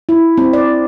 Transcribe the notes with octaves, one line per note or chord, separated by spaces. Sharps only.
E4
C4
D5